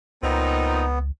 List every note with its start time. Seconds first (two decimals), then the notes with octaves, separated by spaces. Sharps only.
0.23 C#2 A#2 B3 C4 D#4